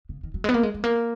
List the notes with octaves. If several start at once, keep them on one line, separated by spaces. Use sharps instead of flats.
C#3
D#3
F#3
G#3
B3
A#3
G#3
G#3
A#3